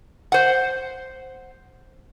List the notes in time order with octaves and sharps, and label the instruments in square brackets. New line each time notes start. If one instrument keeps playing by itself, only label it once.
[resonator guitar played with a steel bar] C5 F#5